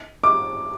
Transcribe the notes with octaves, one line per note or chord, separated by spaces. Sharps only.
D6